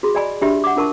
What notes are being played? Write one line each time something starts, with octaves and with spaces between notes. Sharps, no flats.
F#4 G#4 B5
D5 D#5 G#5 B5
D4 F#4 G4 E5 B5
F#5 D6
D4 F4 A#4 A5 C#6